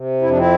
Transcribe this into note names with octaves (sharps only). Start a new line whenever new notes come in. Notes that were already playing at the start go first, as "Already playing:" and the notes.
Already playing: C3
F2 E4
D4
C4 E4